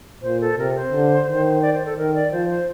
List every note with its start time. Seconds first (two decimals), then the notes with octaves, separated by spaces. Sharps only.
0.23 A#2 C5
0.41 A4
0.58 C3 A#4
0.75 C5
0.92 D3
1.28 D#3
1.62 D5
1.73 C5
1.86 A4
1.97 D#3 A#4
2.14 D5
2.31 F3 C5
2.49 C5